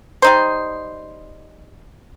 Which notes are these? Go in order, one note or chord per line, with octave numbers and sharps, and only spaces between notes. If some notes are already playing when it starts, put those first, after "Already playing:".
G3 D#4 C5